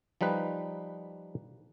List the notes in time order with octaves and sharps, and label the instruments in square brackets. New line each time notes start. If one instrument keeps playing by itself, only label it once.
[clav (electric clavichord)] F3 G3 D#4 B4